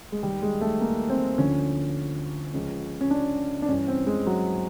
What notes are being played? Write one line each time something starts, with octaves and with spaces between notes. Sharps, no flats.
G#3
D#2 D#3 G3
G#3
A3
A#3
C4
D2 D3 F3 C#4
C#2 C#3 F3
C#4
D4
D4
G2 E3 C#4
C4
G#3
F#3